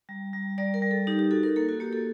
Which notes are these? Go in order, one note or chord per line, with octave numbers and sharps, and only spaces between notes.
G3
G3
G3 D5
A#4
G3
A4
D#4 G4
G4
F#4 A4
A#4
A#3 A4
F#4
A#3 G4
A4